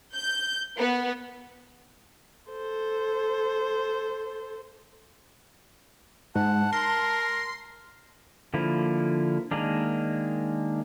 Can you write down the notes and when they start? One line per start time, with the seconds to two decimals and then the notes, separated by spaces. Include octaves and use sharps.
0.13 G6
0.79 B3
2.51 A4 C5
6.35 G#2 F#5 A5
6.73 A#4 C6
8.54 D3 F3 A#3 E4
9.51 D#3 G#3 A#3 D4